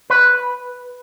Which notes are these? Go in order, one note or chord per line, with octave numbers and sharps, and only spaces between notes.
B4